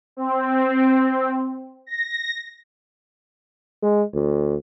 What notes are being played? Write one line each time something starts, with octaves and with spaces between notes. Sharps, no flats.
C4
A#6
G#3
D2